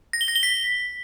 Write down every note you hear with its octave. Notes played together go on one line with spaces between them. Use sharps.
A#6
G7
A#6
G7
B6